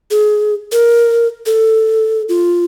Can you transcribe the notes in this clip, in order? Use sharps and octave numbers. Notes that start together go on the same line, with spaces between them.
G#4
A#4
A4
F4